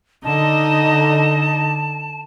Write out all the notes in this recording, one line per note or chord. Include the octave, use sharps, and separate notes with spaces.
D3 D#4 D#5 A5